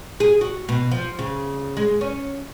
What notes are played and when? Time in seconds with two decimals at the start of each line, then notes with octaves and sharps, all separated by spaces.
0.20 G#4
0.41 F#4
0.69 B2
0.91 F3
1.19 C#3
1.77 G#3
2.01 C#4